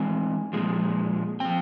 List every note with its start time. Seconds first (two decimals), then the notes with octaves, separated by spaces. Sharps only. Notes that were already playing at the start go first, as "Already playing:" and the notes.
Already playing: E3 G#3 C4 G#5
0.53 A#2 F3 G#3
1.40 F3 C4 G5